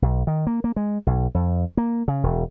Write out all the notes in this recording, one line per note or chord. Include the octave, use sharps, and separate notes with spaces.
B1
D#3
A#3
A#3
G#3
B1
F2
A#3
C#3
E1